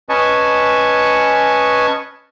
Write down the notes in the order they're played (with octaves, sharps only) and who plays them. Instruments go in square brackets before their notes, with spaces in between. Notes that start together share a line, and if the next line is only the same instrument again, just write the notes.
[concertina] C#4 B4 D#5 G#5 A5 C#6